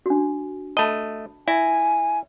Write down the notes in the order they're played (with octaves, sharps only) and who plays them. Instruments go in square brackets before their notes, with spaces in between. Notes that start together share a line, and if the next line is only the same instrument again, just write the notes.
[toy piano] D4 F#4
[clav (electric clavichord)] A3 D#5 [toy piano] A5 B5
[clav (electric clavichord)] E4 [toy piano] E5 [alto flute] G#5